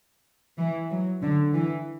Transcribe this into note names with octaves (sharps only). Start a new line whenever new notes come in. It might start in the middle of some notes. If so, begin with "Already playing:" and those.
E3
F#3
D3
E3